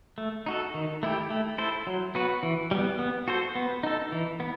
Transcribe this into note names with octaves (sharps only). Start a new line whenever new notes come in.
A3
D#4 F#4 A4
D#3
A3 E4 G4
A3
E4 A4 C5
F#3
B3 F#4 B4
E3
G3 B3
B3
F#4 A4 C5
B3
D#4 A4
E3
B3